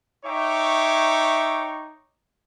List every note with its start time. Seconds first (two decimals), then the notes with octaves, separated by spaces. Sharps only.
0.25 D#4 C#5 E5 G5 C#6 D6